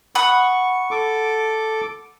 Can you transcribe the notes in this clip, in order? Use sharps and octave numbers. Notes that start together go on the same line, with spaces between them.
F#5 B5 C#6 D#6
A4 D6